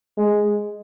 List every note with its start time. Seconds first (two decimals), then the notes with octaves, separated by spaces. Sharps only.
0.17 G#3